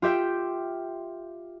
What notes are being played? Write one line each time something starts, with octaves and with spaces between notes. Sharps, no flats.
F4 G4 E5 G5